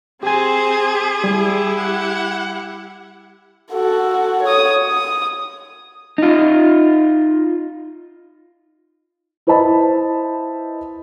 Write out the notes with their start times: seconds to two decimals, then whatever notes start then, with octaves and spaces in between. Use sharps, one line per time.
0.23 C4 G4 G#4 C5 G#5
1.24 G3 E4 G4
1.78 F#5
3.72 F#4 A4
4.43 C#5 D#6
4.87 D#6
6.18 D#4 F4
9.47 E4 B4 C5 D#5 A5 B5